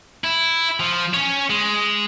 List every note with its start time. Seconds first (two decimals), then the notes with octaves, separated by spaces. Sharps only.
0.24 E4
0.80 F3
1.14 C#4 C#5
1.50 G#3